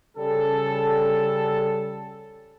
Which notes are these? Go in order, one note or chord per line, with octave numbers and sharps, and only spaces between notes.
C#3 G3 C#4 A4